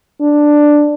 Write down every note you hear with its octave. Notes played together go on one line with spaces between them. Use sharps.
D4